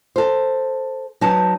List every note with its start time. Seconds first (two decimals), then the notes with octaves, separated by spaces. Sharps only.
0.16 A4 C5
1.21 F#3 D#4 B4 A5